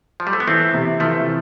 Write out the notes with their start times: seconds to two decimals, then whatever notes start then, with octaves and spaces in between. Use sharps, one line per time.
0.20 F3
0.27 G3
0.33 A3
0.40 B3
0.47 E3 A3 C4
0.74 C3
1.00 E3 F3 A3